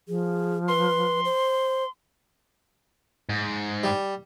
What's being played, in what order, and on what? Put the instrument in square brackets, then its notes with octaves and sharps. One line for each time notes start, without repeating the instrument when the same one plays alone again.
[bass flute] F3 [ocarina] G#4
[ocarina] B4 [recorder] C6
[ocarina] C5
[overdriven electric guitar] G#2
[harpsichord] G3